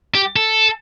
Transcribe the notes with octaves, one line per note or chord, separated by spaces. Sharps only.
G4
A4